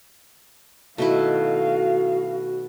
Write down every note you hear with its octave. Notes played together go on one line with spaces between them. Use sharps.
B2 D#3 A3 E4 F#4 F5